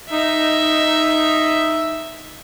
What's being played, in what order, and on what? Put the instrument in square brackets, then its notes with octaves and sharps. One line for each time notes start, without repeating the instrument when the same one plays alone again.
[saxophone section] D#4 [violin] E5